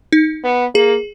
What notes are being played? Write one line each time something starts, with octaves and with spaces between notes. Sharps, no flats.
D#4
B3
A#3 G#4